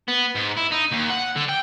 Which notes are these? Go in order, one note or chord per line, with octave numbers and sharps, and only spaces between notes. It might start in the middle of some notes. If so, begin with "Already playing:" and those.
B3
G#2
E4
D#4
D#2
F#5
D3
G5